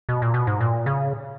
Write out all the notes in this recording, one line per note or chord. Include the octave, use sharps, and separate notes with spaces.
B2
A#2
B2
G#2
A#2
C#3